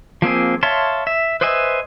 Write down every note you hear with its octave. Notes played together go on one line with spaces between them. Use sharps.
F3 A#3 C4 G#4
C#5 E5 F5 A5 C6
E5
B4 C5 D#5 E5 G#5